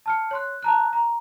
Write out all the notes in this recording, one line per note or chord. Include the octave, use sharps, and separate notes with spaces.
A5 F6 C#7
C#5 C6 F#6
A5 A#5 F#6
A#5